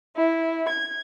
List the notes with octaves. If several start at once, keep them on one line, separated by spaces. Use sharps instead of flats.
E4
G#6